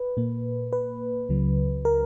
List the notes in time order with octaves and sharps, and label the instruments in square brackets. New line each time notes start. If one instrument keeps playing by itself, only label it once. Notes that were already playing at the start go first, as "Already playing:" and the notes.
Already playing: [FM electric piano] B4
A#2 A#3
B4
C#2 C#3 F#3
A#4